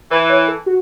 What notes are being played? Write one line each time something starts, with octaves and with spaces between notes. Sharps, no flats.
E3 B4
C#5
A4
F#4